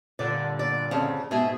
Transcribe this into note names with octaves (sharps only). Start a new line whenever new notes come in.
G2 A#2 D3 D5
D5
F2 C#3
G#2 B2 G#4 E5